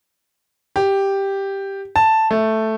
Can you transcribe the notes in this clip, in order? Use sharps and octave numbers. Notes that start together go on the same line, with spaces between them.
G4
A5
A3